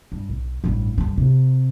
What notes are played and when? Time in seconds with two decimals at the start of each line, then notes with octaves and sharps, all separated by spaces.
0.12 G2
0.29 B1
0.64 A1 G2
0.98 G2 D3
1.17 C3